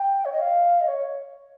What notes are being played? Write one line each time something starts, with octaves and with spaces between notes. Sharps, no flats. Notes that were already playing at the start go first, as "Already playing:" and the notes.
Already playing: G5
C#5
D#5
F5
D#5
C#5